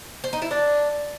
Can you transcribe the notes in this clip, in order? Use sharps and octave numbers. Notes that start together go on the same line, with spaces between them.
C5
D#4
E4
D4